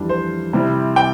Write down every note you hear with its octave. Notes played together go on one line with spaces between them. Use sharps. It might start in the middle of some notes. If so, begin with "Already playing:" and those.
Already playing: F2 E3 G3 D4
C5
C3 G3 C4 E4
G5